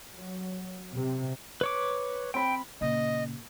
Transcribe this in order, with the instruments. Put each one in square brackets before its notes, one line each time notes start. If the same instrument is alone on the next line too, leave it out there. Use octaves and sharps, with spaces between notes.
[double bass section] F#3
C3
[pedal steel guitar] B4 C#5 D6
[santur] C4 B5 [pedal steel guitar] G5
[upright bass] A#2 C#3 [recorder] D#5